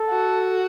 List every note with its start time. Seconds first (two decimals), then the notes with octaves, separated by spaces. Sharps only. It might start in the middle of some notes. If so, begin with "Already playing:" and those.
Already playing: A4
0.11 F#4